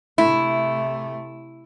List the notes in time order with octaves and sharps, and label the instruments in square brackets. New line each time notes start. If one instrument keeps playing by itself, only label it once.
[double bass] C3 A3 [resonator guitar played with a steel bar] E4